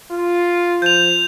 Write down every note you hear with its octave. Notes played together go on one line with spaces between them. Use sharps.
F4
F3 G6 F7